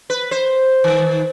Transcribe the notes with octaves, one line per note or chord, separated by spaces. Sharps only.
B4
C5
D#3